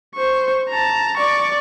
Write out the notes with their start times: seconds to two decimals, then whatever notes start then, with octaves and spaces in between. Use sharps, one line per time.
0.16 C5 C#6
0.69 A5 A#5
1.17 D5 C#6